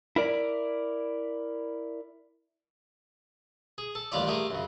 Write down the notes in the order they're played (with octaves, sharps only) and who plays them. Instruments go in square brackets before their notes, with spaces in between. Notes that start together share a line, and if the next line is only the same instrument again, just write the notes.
[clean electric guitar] E4 A#4 D5
[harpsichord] G#4
A4
A1 D#2 G3 F4 G4 D5
A3 G4 G#4 A#4
F#2 C#3